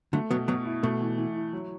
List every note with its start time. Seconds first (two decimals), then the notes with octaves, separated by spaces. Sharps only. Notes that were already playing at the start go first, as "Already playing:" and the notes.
0.13 D3 F#3 A3
0.30 B2 F#3 B3
0.48 B2 F#3 B3
0.65 E4
0.83 B2 A3
1.01 E3
1.18 E3
1.36 E4
1.53 F#3